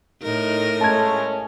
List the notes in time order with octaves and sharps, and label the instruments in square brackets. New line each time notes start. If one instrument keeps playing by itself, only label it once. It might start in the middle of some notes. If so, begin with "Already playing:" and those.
[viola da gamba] A2 A#4 [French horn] D#4
[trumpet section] G#3 A3 [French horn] C#4 [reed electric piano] A5 G#6